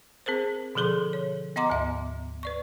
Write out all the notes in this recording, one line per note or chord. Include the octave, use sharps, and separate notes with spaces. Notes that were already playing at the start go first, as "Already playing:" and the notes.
C4 G#4 A#4 C5
B2 D3 F3 G#4 A4 C6
C#5
B3 D#5 F#5 A#5 C6 D6
D2 G#2 E5
B4 D5 C#6